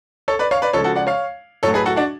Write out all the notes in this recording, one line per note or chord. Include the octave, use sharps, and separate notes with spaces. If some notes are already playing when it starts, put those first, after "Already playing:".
A4 C#5
B4 D5
C#5 F5
B4 D5
C#3 F3 G#3 A4 C#5
F#4 A4
D5 F#5
C#5 F5
A2 F#3 A3 A4 C#5
G#4 B4
F#4 A4
D4 F#4